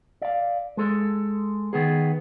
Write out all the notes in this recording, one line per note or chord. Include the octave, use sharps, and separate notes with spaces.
D5 F5
G#3 A4
D#3 B3 G#4